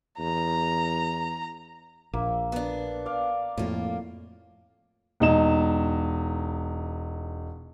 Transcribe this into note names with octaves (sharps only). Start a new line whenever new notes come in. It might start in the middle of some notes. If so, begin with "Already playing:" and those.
E2 A#5
A#1 A#3 E5
B3 D4
D5 F5
F2 A2 A#3 F4
E1 D#4 E7